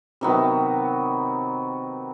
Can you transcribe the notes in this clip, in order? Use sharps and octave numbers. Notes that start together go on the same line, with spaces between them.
C3 D#3 F#3 B3